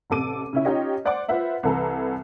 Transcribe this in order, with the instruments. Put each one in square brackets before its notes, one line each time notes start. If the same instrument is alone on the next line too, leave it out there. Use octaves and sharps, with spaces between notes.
[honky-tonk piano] A1 C3 A4 D6 D#7
C#3 C#4 E4
C#4 D#4 F4 G4 C#5 D#5
C5 D5 F#5 C6 D6
F4 B4 C5 E5 F#5
C2 E3 A4 B4 A#5